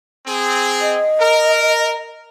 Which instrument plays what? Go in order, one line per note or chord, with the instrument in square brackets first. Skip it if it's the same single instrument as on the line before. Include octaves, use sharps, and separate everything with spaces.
[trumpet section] C4 G#4
[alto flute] D#5
[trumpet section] A#4